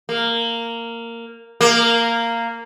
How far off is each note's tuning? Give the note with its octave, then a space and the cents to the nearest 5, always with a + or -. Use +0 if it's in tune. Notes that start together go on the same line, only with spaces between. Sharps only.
A#3 -10
A#3 -10